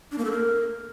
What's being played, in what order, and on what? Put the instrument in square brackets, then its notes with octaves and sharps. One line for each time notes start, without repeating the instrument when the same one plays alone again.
[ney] D4
A#3
A4
A#4